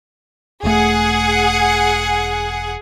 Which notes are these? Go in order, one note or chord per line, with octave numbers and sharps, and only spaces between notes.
E1 A3 G#4 F#5